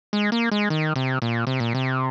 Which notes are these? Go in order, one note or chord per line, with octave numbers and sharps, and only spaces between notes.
G#3
A#3
G#3
D#3
C3
A#2
C3
A#2
C3